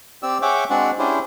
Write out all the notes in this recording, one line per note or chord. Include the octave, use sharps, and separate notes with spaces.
C4 G4 D5 E6
G#4 C#5 E5 F#5 G5 D6
G#3 C4 D4 F#4 D5 F#5
C#4 D4 E4 G4 G#4 C5